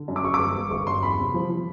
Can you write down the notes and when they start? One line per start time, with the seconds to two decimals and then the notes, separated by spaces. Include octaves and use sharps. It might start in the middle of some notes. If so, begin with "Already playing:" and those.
Already playing: D3
0.08 F#2
0.16 D6
0.24 G1 C#6
0.34 D6
0.39 G1
0.56 G1
0.71 G1 C#6
0.87 F#2 C6
1.03 E2 B5
1.19 C3
1.34 F3
1.49 F3